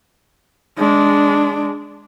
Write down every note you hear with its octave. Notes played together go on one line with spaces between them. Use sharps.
G#3 D4